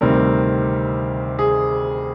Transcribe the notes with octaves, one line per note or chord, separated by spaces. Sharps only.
D2 C3 D#3 G3 C4 A#4
G#4